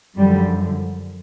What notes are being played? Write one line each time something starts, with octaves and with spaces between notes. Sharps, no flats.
F#2 D3 F3 G3